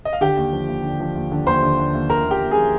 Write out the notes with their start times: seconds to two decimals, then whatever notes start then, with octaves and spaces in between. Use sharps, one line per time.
0.05 D#5
0.13 F5
0.21 D3 G4 G5
0.37 D#2
0.53 F3
0.68 D#2
0.84 D3
1.00 F3
1.16 D#2
1.31 D3
1.46 D#2 C5 C6
1.63 D3
1.78 D3
1.94 D#2
2.10 D3 A#4 A#5
2.25 D#2
2.30 G4 G5
2.42 D#2
2.51 G#4 G#5
2.57 F3